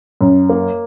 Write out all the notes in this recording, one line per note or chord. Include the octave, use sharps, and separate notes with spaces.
F#2
A#3